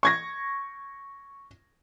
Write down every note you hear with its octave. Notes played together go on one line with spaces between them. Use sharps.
C#6 G#6 A#6